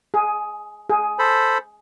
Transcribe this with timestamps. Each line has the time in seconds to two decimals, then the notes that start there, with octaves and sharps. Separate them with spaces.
0.14 G#4
0.90 G#4
1.19 A4 C5 B5